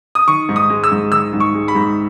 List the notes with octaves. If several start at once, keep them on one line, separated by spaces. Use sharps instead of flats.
D#6
D#3 C#6
G#2
D#6
G#3
E6
G#2
D#3 E6
G#2
C#6
G#3
B5
G#2